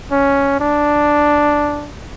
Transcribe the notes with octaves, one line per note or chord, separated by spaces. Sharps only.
C#4
D4